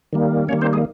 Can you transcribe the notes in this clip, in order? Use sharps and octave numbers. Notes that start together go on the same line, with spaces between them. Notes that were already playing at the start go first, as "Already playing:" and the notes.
D#3 G3 A#3
D#3 G3 A#3 C#4 C#5
C4 C5
G#3 G#4